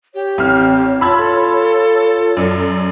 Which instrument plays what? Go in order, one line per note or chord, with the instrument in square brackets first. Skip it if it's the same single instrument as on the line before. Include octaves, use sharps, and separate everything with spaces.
[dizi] G4 [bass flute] C#5
[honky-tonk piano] A1 F6 [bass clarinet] C4
[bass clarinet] F4 [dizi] A5 [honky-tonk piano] B5 E6 G#6
[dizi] A4
[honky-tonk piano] F#2 [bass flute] D5